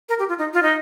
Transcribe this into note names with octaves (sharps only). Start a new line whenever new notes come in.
A#4
G4
F4
D#4
F4
D#4